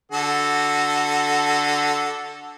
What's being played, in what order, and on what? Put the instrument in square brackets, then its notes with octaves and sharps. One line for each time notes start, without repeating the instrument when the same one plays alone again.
[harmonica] D3 F#4 A4